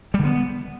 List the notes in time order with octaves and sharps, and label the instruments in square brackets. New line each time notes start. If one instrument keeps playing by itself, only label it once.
[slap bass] G3
D3
B3